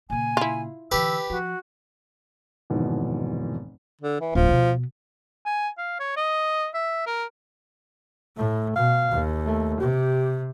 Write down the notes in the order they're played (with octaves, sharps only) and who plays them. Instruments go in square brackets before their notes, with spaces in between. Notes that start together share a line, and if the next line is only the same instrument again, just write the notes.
[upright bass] A#2 C#3 [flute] G#5
[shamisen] E4 F4
[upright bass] D3 E3 [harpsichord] G4 B4 [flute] E6
[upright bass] F3 [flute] F#4
[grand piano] F1 D#2 G#2 B2 E3
[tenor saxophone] D3
E3
[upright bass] D1 [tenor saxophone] F3
[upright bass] B2 B3
[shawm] G#5
F5
C#5
D#5
E5
A#4
[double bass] A2 [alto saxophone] A3
[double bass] B2 [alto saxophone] F5
[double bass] D#2
[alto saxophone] A3
[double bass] C3 [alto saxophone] G4